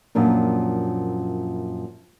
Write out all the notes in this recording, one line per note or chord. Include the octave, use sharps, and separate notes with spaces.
F#2 A#2 F3 D4